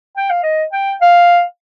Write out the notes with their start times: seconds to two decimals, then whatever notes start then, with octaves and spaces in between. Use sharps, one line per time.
0.17 G5
0.30 F5
0.43 D#5
0.72 G5
1.01 F5